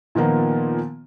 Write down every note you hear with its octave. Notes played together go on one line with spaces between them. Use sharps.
A#2 D#3 F3 A#3 B3